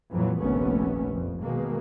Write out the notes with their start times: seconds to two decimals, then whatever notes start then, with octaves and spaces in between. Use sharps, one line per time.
0.11 F2 A#2 E3 F#3
0.39 F1 A#1 D#2 A3 B3 C#4
1.14 F2
1.42 B2 D#3 G#3 A#3